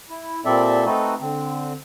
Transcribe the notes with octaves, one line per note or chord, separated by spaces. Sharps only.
E4
A#2 G3 C4 A4 D5 E5
A3 C4 D#4 F#4 A4 B4
D3 C4